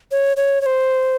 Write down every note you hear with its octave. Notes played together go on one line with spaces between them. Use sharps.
C#5
C#5
C#5
C5